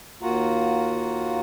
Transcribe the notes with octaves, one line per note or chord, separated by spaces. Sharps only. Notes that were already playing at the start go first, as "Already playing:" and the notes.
D#2 A#3 F4 F#4 F#5 A#5